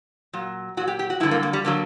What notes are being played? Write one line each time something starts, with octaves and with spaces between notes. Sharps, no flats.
A#2 F#3
A#2 F#3 F#4
G4
G4
F#4
G2 D3 F#3 E4
A#3
A#3
G3
D3 F#3 A#3